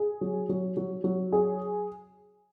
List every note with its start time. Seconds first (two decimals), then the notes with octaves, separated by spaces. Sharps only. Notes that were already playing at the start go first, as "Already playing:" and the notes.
Already playing: G#4
0.21 F#3
0.49 F#3
0.77 F#3
1.04 F#3
1.32 G#4